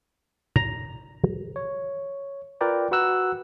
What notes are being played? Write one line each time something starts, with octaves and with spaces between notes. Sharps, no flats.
A#5
C#5
F4 A#4 B4 D5 G5 A#5
F#4 B4 F#5 A#5 E6 F#6